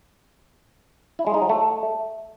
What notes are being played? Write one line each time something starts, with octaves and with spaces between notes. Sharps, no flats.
E4
G#3
D#4
F#3
A3